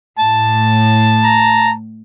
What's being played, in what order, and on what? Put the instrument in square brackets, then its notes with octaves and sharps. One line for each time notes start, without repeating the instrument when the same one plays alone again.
[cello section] A2 [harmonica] A5
[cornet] A#5